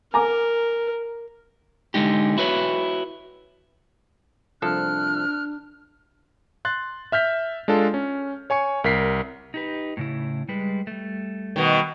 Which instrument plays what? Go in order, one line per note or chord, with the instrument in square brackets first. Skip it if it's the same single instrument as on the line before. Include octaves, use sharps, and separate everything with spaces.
[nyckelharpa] A#4 [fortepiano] G#5 A#5 D6
[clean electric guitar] D3 G#3 D#4 G4
E4 F#4 B4 C#5
[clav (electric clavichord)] C2 F3 A4 [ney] D4 [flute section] F6 F#6
[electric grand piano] C6 F#6 A6
E5 F6 G6 B6
G#3 D4 F4 A4
C#4
C#5 G#5 C#6 C#7
C2 A#4 B6 C7
[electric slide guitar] D#4 G4 B4
A2 C#3 E4
G3 G#3 B4
G3 A3
[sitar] B2 D#3